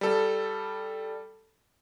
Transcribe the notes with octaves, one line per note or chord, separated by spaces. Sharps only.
G3 A4